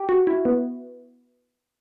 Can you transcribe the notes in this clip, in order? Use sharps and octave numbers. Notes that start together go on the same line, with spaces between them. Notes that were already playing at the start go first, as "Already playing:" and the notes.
Already playing: G4
F#4
E4
B3